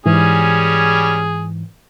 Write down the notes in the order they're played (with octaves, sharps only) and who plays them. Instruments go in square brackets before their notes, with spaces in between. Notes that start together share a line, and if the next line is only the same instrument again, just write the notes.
[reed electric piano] G#2 E3 [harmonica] G3 C#4 [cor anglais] G#4